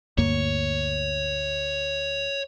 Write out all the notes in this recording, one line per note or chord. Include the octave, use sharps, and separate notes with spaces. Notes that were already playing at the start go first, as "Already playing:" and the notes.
D2 G2 A#3 C#5